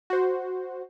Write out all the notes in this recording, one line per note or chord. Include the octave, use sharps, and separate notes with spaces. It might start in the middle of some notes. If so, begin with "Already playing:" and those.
F#4 C5